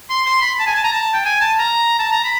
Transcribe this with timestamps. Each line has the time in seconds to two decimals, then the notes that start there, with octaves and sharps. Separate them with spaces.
0.10 C6
0.26 C6
0.42 B5
0.59 A5
0.67 G#5
0.75 A5
0.84 A#5
0.92 A5
1.14 G5
1.25 G#5
1.41 A5
1.59 A#5
1.99 A5
2.12 A#5
2.24 B5